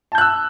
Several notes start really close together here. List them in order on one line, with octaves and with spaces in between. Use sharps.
A5 G6 F#6 E6